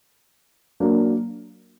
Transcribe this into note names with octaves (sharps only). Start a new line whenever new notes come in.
F#3 A#3 D4